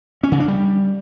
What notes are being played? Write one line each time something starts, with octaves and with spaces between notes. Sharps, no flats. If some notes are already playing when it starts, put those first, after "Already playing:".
C#4
C#3
D4
G3